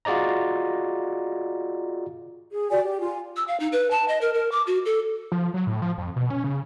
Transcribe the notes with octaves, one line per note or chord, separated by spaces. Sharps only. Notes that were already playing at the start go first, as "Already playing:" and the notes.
F4 F#4 G#4 D5 D#5 A#5
G#4
F#4 G4 D5 G#5
G4
F4 G#5
E6
F5
D#4
B4
A5
D#5
A#4
A#4
D6
F#4
A4
F3
F#3
A2
F3
F2
B2
C#4
C#3